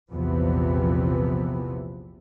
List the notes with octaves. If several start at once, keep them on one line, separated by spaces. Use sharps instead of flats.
A#1 E2 C3 E3 F3 B3